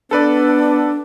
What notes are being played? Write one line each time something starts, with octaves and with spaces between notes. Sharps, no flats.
B3 D4 A4 B4 D5